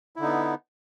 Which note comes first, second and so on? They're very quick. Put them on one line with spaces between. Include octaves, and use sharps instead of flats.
E4 D3 D#4 B3